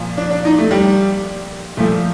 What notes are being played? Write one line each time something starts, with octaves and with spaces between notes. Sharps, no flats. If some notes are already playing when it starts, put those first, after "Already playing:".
Already playing: A#2 F3
D4
D4
D#4
A3
G3
A#2 F3 A3